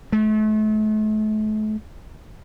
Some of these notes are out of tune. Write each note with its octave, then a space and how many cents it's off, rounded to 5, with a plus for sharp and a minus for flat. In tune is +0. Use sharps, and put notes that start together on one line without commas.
A3 -40